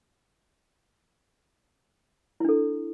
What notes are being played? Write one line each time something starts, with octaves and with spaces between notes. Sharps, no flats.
D4 E4 A4